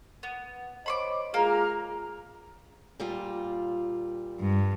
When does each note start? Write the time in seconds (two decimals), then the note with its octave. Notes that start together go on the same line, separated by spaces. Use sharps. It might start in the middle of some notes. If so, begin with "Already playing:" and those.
0.23 B3
0.86 C5 C#5 D#5 B5 C6 D6
1.34 G#3 A#3 F4 G#4 A#5 F6
3.00 A#2 G3 F4
4.40 G2